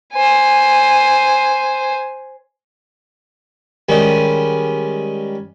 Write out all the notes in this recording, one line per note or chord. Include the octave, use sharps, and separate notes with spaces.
C5 G#5
D#3 G3 G#3 C#4